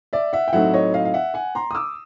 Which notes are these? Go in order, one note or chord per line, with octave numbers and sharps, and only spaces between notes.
D5 E5
E5 F#5
G5
A2 F#3 A3 C4 D#4 E5 F#5
C#5 D#5
D#5 F5
F5
E5 F#5
F#5 G#5
A#5 C6
D#6
D6 E6